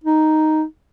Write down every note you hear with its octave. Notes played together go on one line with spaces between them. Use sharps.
D#4